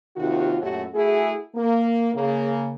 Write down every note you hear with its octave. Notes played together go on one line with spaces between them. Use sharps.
D#2 C3 D#3 F4 F#4
F#2 A#2 A3 F#4 G4 C#5
A3 E4 F#4 G#4
A#3
C#3 A#3